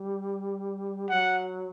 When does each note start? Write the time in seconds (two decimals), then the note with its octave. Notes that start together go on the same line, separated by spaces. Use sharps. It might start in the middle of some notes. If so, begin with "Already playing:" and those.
Already playing: G3
1.09 F#3 F#5